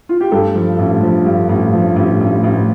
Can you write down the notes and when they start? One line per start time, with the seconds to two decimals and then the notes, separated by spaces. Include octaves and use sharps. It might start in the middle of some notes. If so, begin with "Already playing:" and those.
0.09 F4
0.21 G4
0.32 G2 A4
0.55 F3
0.79 A1
1.03 F3
1.25 G2
1.49 A1
1.73 F3
1.96 A1
2.21 A1
2.43 A1